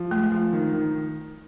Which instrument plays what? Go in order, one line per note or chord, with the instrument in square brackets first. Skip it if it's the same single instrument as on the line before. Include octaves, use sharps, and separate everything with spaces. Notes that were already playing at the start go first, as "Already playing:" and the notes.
Already playing: [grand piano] F3
[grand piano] G#3 [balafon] A3
[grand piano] F3
D#3
D#3